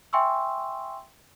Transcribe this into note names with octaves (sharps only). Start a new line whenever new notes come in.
E5 G5 G#5 C6 C#6 E6